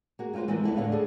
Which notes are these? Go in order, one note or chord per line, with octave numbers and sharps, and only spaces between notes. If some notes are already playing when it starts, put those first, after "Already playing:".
A#3 F#4 G#4
G#3 F4 G4 B4 C5
E3 F3 G#3 A#3 B3 D#4
D2 B3 E4 A4
D#2 A2 D3 C#5 F5
C#3 D4 G#4 A4